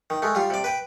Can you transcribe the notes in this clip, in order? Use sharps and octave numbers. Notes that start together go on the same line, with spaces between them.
D#3
G#3 A3
G3 F4
C3 D5
B4 G5